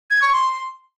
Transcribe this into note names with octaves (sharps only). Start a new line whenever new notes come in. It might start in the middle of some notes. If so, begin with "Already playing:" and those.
G#6
C#6
C6